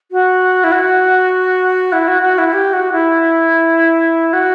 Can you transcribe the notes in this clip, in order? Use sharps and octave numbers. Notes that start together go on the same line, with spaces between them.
F#4
E4
F#4
E4
F#4
F#4
E4
G4
F#4
E4
F#4